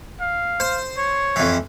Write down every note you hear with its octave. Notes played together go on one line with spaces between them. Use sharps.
F5
C5
C#5
F2 E3